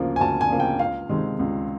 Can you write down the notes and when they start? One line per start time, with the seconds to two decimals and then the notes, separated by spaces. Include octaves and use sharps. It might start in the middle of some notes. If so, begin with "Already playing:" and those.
Already playing: D2 C#3 F3 A#3
0.16 G#5
0.20 D2 A5
0.41 G#5
0.49 C#3 F3 A#3
0.60 G5
0.79 C#2 F5
1.09 C3 D#3 G#3
1.39 C#2